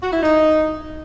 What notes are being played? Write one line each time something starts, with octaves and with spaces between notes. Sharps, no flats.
F#4
E4
D#4